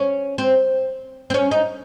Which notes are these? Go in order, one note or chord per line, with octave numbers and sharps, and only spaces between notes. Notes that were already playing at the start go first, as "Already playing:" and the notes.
Already playing: C#4
C4
C4
C#4
D#4